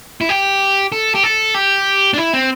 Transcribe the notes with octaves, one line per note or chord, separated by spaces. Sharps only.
E4
G4
A4
G4
A4
G4
D4
E4
C4